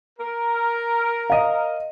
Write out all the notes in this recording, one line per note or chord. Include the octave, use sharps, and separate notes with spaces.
A#4
D#5 F5